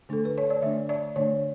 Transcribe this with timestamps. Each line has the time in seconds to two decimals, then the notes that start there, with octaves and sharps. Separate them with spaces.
0.09 D3 A3 D4 A4
0.25 B4
0.38 C#5
0.50 D5
0.62 D3 A3 D4 E5
0.89 D5
1.16 D3 A3 D4 C#5